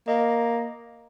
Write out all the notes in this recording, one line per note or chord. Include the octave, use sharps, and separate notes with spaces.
A#3 D#5